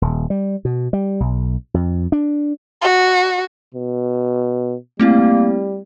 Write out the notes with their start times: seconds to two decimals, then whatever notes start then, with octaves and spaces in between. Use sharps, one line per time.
0.02 D#1
0.30 G3
0.65 B2
0.93 G3
1.20 B1
1.74 F2
2.12 D4
2.82 F#4
3.74 B2
5.00 G3 A3 A#3 C4 E4